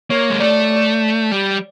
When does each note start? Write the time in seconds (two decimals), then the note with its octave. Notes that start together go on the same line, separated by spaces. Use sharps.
0.10 A#3 C#5
0.30 G#3
0.40 A3 D5
1.31 G3